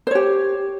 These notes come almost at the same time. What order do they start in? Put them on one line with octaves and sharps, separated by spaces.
C5 C#5 G4